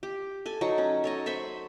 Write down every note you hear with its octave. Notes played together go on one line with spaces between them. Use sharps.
G4
A4 G#5
F#3 D#4 C#6
C#4
A4 C#5 D#5
C5 E5 B5 C#6